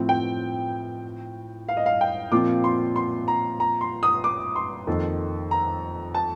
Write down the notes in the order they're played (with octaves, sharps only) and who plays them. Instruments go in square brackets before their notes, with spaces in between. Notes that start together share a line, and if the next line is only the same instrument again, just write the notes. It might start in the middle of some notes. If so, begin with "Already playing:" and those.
Already playing: [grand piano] A2 F3 C4
[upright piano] G5
F5
D#5
F5
G5
[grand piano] A#2 F3 C4 F4 [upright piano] D6
[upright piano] C6
C6
A#5
A#5
C6
D#6
D6
C6
[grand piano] F2 D#3 A#3 D#4 A4
[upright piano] A#5
A5